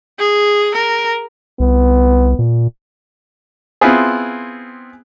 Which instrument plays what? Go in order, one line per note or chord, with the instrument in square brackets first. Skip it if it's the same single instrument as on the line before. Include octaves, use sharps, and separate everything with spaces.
[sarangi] G#4
A#4
[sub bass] C2 [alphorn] B3
[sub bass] A#2
[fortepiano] B3 C4 E4 F4 G#4